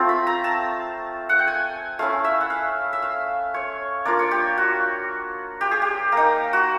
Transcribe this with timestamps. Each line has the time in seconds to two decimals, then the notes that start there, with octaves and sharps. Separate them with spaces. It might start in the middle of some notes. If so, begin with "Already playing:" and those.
Already playing: A3 C4 F4
0.09 B5
0.27 A#5
0.44 A5
1.29 F#5
1.39 G5
1.47 G#5
1.99 A3 C#4 E4 F5
2.24 E5
2.41 F#5
2.50 F5
2.93 E5
3.02 F5
3.54 C#5
4.05 A#3 D4 F4 D5
4.19 C#5
4.31 G4
4.58 F#4
5.61 G4
5.71 G#4
5.82 G4
6.12 A#3
6.17 D#4
6.53 F#4